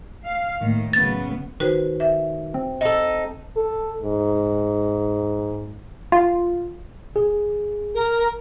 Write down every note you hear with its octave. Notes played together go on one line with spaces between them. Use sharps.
F5
A2 D#3 A#3
F#2 C#3 B3 A6
D#3 F#4 B4 C5
E5
C4
D#4 A4
A4
G#2
F4
G#4
A#4